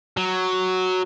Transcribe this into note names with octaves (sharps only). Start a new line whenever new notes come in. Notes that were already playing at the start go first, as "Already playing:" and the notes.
F#3